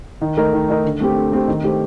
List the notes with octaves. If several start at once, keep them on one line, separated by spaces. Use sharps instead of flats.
D#3
A3 D#4 A#4 D#5
D#3
A3 D#4 A#4 D#5
D3
A3 C4 G4
D3
A3 C4 G4
D#3
A3 D#4 G4 C5